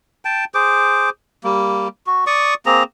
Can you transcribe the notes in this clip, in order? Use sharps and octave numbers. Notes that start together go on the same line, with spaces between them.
G5 A5
G#4 C5 D6
G3 A#3
F#4
D5 C#6 D#6
A#3 C4 G#4 A#5